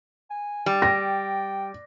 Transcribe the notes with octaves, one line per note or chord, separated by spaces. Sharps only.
G#5
G3
G5 A#6